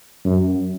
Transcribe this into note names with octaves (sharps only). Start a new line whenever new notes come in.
F#2